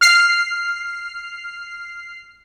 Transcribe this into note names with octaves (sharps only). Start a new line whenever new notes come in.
F6 C7